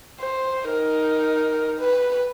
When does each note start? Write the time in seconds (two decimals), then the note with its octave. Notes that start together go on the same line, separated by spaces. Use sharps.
0.20 C5
0.68 D#4 A#4
1.80 B4